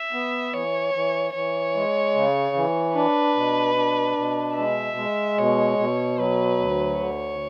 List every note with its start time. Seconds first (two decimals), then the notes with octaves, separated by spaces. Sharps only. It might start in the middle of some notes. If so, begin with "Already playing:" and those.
Already playing: E5
0.13 B3
0.54 E3 C#5
0.94 E3
1.34 E3 C#5
1.75 G#3
2.15 C#3
2.56 E3
2.95 D4 B4
3.36 B2
3.76 D4
4.17 B2
4.56 G#3 E5
4.97 G#3
5.38 B2 C#5
5.78 B2
6.18 F#3 B4
6.59 D2
6.99 D3 C#5